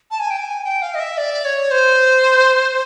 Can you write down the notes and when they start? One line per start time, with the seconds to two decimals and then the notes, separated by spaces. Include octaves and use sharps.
0.11 A5
0.20 G#5
0.30 G5
0.39 G#5
0.64 G5
0.82 F5
0.95 D#5
1.00 E5
1.18 D5
1.45 C#5
1.71 C5